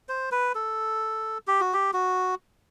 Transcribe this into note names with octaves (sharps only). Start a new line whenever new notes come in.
C5
B4
A4
G4
F#4
G4
F#4